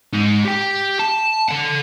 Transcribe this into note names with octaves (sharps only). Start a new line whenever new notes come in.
G#2 D#4
G4 G5
A5
A4 F#5